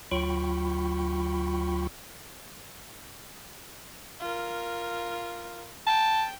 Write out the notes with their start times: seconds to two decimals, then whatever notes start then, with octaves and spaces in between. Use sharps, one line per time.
0.11 D2 F#3 F4 G5 B5 C#6
4.20 F4 A#4
5.87 G5 A5